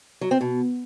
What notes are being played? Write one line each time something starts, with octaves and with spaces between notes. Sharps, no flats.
F#3
C4
B2